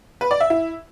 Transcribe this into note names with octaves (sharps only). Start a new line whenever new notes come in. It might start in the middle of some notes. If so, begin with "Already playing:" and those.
B4
D5
E5
E4